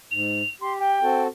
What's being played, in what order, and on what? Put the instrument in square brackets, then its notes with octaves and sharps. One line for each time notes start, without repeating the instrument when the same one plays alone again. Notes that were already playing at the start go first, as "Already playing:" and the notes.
[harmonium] G#2 [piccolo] F7
[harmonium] G4 [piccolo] C6
[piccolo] G5
[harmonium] C4 F#4 A4